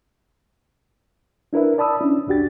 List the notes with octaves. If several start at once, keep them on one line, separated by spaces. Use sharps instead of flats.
D4 E4 A#4 B4 E5
D5 A5 B5 D#6 E6
C#4 D4 E4
C2 F2 D4 F#4 G4 A6